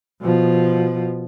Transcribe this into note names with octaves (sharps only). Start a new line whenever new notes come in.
B2 F3